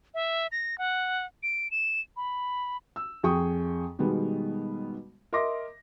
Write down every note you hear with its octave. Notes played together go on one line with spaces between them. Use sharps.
E5
A#6
F#5
D7
E7
B5
E6
F2 G#4 G5 C#6 D#6
B2 D#3 G3 G#3 B3
A#4 D#5 E5 C6 D6 A#6